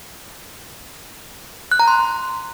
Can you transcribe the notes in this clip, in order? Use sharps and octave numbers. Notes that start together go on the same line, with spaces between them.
F#6
A#5
C6